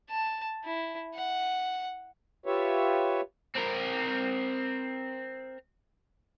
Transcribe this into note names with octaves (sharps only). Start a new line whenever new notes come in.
A5
E4
F#5
F4 G4 B4 C#5 E5
C4 A#4